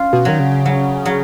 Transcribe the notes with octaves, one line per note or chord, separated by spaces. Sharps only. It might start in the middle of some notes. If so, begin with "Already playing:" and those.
Already playing: C#4 F4
B2
D#3 F#3
C#3
F#3
F#3